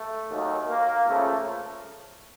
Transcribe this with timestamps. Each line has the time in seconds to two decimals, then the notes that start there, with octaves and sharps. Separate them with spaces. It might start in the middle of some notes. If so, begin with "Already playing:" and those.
Already playing: A3
0.30 D#2 D#3 F#3
0.68 A#3
1.06 C#2 C#3 F3 A3